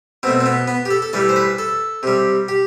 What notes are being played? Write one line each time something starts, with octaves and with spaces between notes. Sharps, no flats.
B2 A3 C4
C4
B3
B3
G4
A4
A4
A2 E3 G3 A4
C5
B4
A4
C3 G3
G4